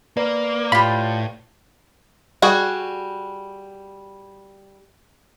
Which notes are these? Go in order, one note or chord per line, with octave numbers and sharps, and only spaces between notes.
A#3 B4 D5
A2 F4 G4 B5
G3 F#4 G#4